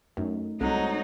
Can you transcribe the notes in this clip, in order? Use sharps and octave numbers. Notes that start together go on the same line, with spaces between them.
F#2 A3 D#4
C2 F#3 G#3 C4 D#4 A4